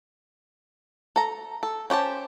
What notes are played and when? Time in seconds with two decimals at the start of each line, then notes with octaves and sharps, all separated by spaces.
1.16 A4 A#5
1.63 A4
1.90 C#4 G4 C5 A5